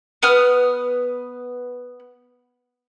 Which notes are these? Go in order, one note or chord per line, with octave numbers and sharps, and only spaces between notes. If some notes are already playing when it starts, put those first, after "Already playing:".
B3 B4 D#6 F6